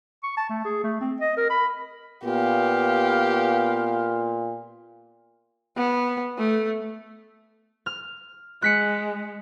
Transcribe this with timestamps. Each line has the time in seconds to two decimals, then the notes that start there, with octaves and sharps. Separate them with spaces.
0.23 C#6
0.37 A5
0.49 A3
0.65 G#4
0.83 A3
1.01 C4
1.20 D#5
1.37 A#4
1.50 B5
2.25 A#2 B3 G4 F5
5.77 B3
6.38 A3
7.86 F6
8.62 G#3 F#6 B6 C#7